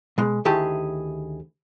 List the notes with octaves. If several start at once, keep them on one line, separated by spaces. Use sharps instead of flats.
B2 G#3
D2 D#3 E4 G4 G#4 A5